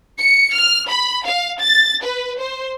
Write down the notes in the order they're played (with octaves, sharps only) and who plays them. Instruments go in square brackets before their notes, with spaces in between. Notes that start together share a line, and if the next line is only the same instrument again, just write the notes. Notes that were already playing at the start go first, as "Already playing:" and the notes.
[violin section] C#7
F6
B5
F5
A6
B4
C5